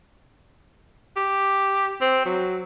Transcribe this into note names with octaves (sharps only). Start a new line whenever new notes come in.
G4
C4
F#3